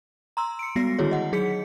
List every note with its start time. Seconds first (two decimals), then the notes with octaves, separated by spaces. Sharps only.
0.37 A#5 C6 E6
0.59 C#7 D7
0.76 G3 G#3 B3 F#4 A#6 C7
0.99 D3 D#3 E4 F#4 G#4 C#5
1.11 D#5 F#5
1.32 F#3 D#4 G#4 B6 C#7